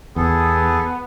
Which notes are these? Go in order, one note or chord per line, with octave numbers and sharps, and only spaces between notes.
E2 B3 G#4 A4